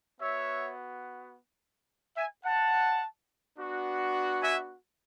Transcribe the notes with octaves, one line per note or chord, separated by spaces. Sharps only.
B3 F#4 C#5 E5
E5 G#5
F#5 A5
B3 D4 F#4
E5 G#5